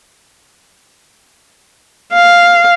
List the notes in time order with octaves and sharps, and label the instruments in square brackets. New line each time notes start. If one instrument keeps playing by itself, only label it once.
[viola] F5